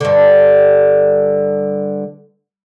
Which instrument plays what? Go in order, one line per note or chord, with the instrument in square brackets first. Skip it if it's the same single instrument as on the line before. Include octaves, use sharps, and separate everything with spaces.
[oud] G2 D3